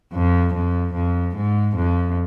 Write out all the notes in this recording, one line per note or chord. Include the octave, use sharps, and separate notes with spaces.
F2
F2
F2
G#2
F2